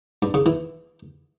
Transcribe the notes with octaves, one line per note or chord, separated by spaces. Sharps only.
G2
C#3
E3